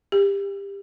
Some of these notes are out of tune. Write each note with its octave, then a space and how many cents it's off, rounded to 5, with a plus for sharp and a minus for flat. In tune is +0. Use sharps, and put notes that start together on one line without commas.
G4 +25